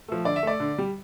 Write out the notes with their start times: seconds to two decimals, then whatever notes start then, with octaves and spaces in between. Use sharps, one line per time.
0.08 F3 A3
0.25 D3 D5
0.36 E5
0.43 A3 D5
0.60 D3
0.78 G3